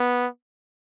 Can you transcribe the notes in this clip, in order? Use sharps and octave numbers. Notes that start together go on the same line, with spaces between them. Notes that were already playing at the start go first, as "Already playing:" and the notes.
Already playing: B3